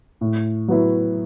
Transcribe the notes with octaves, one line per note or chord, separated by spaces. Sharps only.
A2
F#3 B3 E4